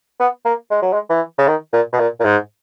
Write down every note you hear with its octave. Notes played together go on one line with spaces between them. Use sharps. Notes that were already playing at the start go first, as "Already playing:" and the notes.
B3
A#3
G#3
F#3
G#3
E3
C#3
D#3
A#2
B2
A#2
A#2
G#2